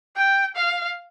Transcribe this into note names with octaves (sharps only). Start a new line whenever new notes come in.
G5
F5